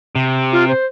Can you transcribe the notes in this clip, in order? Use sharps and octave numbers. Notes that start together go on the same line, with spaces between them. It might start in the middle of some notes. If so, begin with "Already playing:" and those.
C3
F4
C5